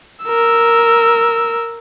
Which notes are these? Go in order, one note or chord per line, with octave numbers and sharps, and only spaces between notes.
A#4 E6